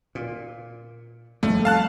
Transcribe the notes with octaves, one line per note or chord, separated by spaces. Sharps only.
A#2
F2 G3 A3 A#3
F5 A5 F#6